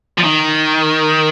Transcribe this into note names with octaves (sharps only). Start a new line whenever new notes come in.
F3
D#3